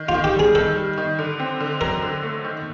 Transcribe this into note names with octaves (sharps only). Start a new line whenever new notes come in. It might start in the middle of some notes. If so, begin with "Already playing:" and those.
Already playing: D#3
F4
D#3
G4
G3 G#4
D#3 A4
G3
D#3
D3
C4
D3
F#3 A#4
D3
A3
D#3